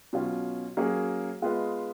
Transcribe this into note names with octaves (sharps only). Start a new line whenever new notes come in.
B2 F#3 C#4 F4
F#3 A#3 C#4 G#4 C#5
G#3 B3 F4 B4 D#5